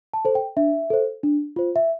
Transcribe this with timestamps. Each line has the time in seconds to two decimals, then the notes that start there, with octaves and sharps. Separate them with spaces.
0.14 A5
0.25 A4 C5
0.35 G5
0.57 D4 E5
0.90 A4 C5
1.23 D4
1.56 F4 C5
1.76 E5